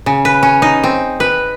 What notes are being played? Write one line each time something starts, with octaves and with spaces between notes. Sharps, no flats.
C#3
B4
C#4
D#4
C4
B4